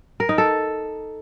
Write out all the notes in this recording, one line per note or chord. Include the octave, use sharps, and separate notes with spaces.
A#4
D#4
A4